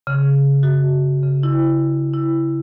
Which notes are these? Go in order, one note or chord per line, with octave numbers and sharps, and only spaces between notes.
C#3
F#4
C#3
E4
E4